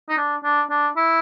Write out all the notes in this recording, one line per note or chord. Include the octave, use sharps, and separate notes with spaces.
D#4
D4
D4
D4
E4